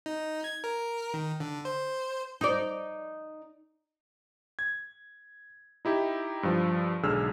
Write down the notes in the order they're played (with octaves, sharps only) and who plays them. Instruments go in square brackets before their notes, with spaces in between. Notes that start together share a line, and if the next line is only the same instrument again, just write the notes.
[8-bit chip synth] D#4
G#6
A#4
D#3
D3
C5
[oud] D#4 D5
[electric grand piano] G#6
D#4 E4 G4
G2 F3
B1 G#2 D3 G#4 E6 F6